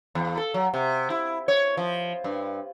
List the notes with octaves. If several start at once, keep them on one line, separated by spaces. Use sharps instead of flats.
E2
A4
F#3
C3
E4
C#5
F3
G2